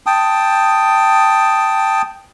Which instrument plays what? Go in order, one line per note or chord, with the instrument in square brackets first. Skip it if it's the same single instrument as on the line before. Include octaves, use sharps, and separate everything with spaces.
[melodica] G5 A5 D#6